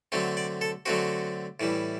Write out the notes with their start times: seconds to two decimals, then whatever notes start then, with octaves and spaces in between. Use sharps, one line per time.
0.12 D3 F#3 A3 C4
0.37 D5
0.61 A4
0.86 D3 F#3 A3 C4 F#4
1.60 A2 E3 G3